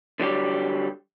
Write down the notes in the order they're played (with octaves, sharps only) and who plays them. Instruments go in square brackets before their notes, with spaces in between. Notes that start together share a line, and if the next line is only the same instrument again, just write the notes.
[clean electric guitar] D3 F#3 G3 G4